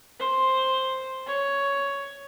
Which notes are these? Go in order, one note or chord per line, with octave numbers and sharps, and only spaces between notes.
C5
C#5